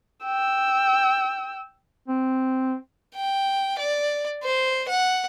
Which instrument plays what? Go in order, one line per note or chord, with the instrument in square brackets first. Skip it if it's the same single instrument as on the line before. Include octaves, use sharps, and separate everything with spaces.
[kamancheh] G5 E6
[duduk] C4
[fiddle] G5
D5
C5
F#5